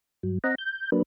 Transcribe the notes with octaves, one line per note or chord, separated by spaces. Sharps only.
G2 F#3
C4 D#5 F#5 A#5
G6
F#3 A#3 D4 B4